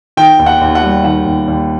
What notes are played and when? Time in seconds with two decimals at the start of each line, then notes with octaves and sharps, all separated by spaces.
0.17 D#3 G5
0.39 D#2
0.46 F#5
0.61 D#2
0.75 F#5
0.83 G3
1.04 D#3 F#5
1.26 D#2
1.48 D#2